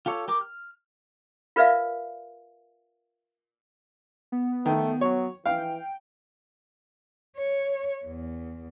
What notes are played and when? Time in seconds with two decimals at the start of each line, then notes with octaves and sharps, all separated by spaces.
0.06 F4 G4 A4 C#5
0.28 G4 A#4 D6
0.41 F6
1.56 F4 A#4 B4 D5 E5 F5
4.32 B3
4.66 D#3 A3
5.01 F#3 C#5
5.46 E3 F5 G5
7.38 C#5
8.05 E2